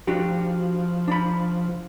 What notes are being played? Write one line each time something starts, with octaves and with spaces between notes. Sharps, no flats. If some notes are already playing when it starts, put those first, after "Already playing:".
F3 D4 F#4 G4
D4 B5